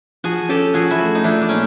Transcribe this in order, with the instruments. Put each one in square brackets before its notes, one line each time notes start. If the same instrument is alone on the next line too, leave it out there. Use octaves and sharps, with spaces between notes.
[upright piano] F3 [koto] F#4 G#4
[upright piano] C#4 [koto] G4 A4
[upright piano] F3 [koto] F#4 G#4
[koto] E4 F#4
[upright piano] A3
[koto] D#4
[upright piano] F3 [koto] D4 E4
[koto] D4
[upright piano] A#2 [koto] C#4 D#4